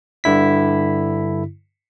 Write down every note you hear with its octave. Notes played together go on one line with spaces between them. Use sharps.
G2 D3 E4 B6